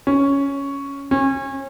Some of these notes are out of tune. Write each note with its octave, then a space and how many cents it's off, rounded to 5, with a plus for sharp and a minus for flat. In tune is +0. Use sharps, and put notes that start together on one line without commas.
C#4 +5
C#4 -30